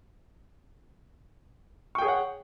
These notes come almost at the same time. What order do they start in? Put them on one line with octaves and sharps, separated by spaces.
C#6 G5 G#4 C#5 F#5